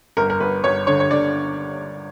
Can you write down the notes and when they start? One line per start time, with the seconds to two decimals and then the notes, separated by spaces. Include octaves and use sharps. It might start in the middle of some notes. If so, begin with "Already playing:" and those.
0.17 G1 A#4
0.30 A#4
0.40 G1 B4
0.64 G1 C#5
0.87 D3 C#5
1.00 C#5
1.11 D3 D5